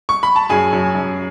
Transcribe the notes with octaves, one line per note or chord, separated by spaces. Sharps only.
C#6
B5
A5
F#2 G#4 G#5
F#2
F#2